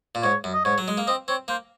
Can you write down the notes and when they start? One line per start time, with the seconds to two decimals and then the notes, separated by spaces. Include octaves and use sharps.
0.15 A#2
0.23 G#2 C#5
0.44 F#2
0.53 D#5
0.65 G#2 C#5
0.78 F#3
0.88 G#3
0.97 A#3
1.07 C4 D#5
1.28 C4 C#5
1.48 A#3 C5